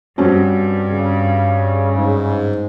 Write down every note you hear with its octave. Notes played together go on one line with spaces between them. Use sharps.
G2 C4 C#4 F#4
C#3
G#2